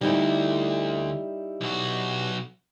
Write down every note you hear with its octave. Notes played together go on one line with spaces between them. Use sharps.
D2 G3 D#4 E4
B1 F#4